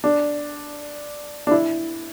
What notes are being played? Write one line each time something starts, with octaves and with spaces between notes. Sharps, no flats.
D4
D4
E4